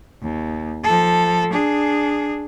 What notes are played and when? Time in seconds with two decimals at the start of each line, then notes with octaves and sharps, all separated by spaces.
0.22 D#2
0.84 F3 A4
1.52 D4 G#4